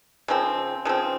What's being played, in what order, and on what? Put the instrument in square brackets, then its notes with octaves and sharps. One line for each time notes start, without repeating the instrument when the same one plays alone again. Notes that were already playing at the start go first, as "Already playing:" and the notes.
[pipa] C#3 F3 C4
C#3 F3 C4